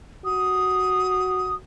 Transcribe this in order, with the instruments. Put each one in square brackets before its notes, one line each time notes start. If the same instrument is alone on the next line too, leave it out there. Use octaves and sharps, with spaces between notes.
[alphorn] F#4 [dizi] D#6